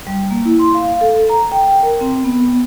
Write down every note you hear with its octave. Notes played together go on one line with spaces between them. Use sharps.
G3
A#3
E4
C6
F5
F5
A4
A#5
G5
A#4
C4
B3